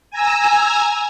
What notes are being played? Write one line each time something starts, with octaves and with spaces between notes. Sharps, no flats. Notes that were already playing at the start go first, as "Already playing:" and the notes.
G#5 A#5 E6